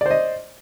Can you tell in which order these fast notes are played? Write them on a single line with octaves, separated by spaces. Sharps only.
D5 C5 D#5